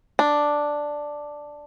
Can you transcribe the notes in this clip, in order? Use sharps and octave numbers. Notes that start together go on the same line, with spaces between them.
D4